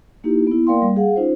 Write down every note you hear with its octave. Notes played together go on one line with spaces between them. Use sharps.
A#3 D#4 E4 G4
B3 E4
A#3 A#4 D5 F5 G5 C6
G3
G#4 F5 F#5
C#4 D#4 F4 C5